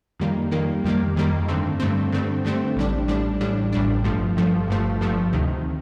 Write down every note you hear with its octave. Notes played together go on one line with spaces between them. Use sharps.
F2 D#3 G3 A#3
F2 D#3 G3 A#3
F2 D#3 G3 A#3
F2 D#3 G3 A#3
G2 D3 A3 C4
G2 D3 A3 C4
G2 D3 A3 C4
G2 D3 A3 C4
A1 A2 G3 D4
A1 A2 G3 D4
A1 A2 G3 D4
A1 A2 G3 D4
G1 G2 F3 A3
G1 G2 F3 A3
G1 G2 F3 A3
G1 G2 F3 A3
D2 C3 D#3